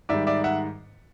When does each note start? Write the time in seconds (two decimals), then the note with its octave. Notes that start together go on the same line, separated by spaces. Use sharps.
0.09 G#2 D#3 G3 D5 E5
0.27 D5 E5
0.44 E5 F#5